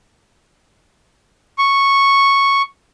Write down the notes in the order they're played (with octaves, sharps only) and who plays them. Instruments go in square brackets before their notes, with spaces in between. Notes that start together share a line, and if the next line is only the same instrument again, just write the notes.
[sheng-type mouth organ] C#6